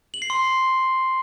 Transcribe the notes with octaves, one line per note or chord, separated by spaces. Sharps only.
F#7
C7
C6